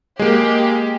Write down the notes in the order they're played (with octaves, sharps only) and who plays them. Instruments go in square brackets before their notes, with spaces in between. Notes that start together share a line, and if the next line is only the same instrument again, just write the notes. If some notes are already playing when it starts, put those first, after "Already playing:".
[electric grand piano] G#3 A#3 [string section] G4